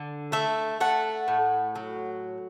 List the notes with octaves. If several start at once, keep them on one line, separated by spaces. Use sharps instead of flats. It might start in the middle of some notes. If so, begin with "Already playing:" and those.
Already playing: D3
A3 E5
A3 F#5
A2
F#3